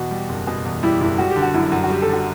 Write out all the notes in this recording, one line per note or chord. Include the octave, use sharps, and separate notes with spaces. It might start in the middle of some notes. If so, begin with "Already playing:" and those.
Already playing: E2 B2 F#4
G3
F#1
B2
E2
G3 E4
F#1 E4
G3 F#4
G4
D3
F#4
F#2 E4
F#2 F#4
F#4
G3 G4
A4
D3
F#4